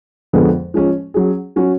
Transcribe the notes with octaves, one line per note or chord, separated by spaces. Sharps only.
F2 D3 G#3 B3
F3 G#3 C#4
F#3 C#4 G#4
F#3 C#4 F#4